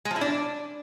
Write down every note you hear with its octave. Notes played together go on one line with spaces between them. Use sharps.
G#3
F3
E4
D4